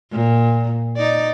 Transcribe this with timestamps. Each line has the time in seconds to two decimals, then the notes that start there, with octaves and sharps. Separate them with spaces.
0.11 A#2
0.97 D#4 D5